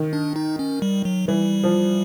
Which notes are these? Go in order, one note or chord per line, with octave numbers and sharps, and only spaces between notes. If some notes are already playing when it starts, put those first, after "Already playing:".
Already playing: D#3
D4
D#4
C#4
G3
F#3
E3 G3
F3